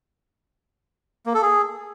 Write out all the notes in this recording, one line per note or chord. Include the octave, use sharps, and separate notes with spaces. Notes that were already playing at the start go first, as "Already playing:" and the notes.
A#3
A4
G#4